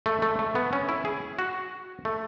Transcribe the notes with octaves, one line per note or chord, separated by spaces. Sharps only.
A3
A3
A3
B3
C#4
E4
G#4
F#4
A3